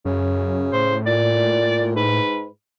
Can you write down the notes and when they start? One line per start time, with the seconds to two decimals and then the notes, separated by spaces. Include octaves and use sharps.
0.05 F#2 C#3
0.73 A2 C5
1.06 A#2 D5
1.96 G#2 B4